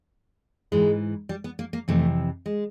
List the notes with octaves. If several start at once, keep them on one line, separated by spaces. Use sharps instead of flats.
G#2 E3 G#3
G3
B3
A#3
A#3
F2 C3 E3 A3
G#3